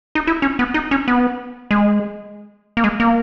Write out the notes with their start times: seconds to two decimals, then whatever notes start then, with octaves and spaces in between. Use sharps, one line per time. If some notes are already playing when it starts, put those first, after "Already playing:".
0.15 D#4
0.27 E4
0.42 C#4
0.59 B3
0.74 D#4
0.91 C#4
1.08 B3
1.71 G#3
2.77 A#3
2.84 G#3
3.00 A#3